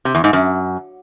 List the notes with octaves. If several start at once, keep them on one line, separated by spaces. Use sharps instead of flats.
C3
E2
G#2
F#2